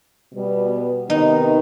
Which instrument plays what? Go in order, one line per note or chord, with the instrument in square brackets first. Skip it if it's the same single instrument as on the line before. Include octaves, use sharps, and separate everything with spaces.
[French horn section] B2 G3 B3
[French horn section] C3 D#3 B3 [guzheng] D#4